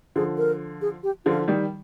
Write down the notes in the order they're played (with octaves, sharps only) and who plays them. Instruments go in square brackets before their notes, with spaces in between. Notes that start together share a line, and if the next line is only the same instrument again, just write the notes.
[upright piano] D3 F3 [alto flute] G#4
[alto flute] A#4
G#4
G4
[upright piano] D3 F3 [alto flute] F4
[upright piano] D#3 G3